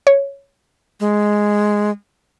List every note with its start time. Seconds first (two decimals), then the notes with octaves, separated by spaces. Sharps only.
0.07 C#5
1.00 G#3